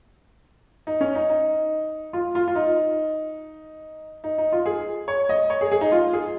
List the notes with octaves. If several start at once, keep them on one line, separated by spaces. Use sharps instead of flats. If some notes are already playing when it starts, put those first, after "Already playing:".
D#4
C#4
D#4
D#4
F4
F4
F4
D#4
D#4
D#4
F4
G#4
C#5
D#5
C#5
G#4
G#4
D#4
F4
G#4